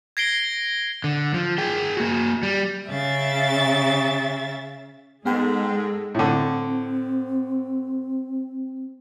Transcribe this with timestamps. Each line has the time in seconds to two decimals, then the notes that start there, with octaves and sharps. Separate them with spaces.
0.17 G#6 A#6 C7 D7 G7
1.04 D3
1.34 F3
1.58 G#4 G5
1.97 A#3 F#4
2.43 G3
2.89 C#3 E5 A6
5.26 G#2 G#3 B3 G#4 A4 F#5 G5
6.15 A2 D3 C4